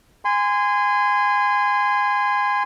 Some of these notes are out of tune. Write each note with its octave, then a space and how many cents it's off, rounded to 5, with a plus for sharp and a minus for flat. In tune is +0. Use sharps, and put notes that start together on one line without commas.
G#5 -15 C6 -25